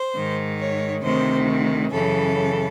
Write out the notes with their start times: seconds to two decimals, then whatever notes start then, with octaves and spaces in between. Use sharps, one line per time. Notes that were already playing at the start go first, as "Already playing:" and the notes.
Already playing: C5
0.14 G#2 D#3
0.59 C#5
1.02 D2 C3 D#3 C5
1.91 F#2 C#3 E3 A4